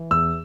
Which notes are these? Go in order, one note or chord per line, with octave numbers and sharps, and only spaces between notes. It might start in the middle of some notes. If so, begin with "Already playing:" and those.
Already playing: E3
E2 E6